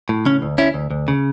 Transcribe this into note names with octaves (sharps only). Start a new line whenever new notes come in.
A2
C#3 C#4
D2
D2 C#4 E4
D2
D2
C#3